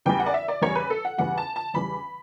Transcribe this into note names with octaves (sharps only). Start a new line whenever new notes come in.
E2 C#3 E3 G3 G5
F#5
D5
E5
D5
E2 C#3 E3 G3 C#5
B4
A4
F#5
E2 C#3 E3 G3 F#5
A5
A5
E2 C#3 E3 G3 B5